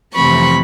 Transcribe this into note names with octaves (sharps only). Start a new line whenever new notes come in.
F2 C3 E3 A3 C4 B5 C#6